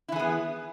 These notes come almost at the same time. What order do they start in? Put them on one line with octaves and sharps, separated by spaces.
E4 E3 G#4 B3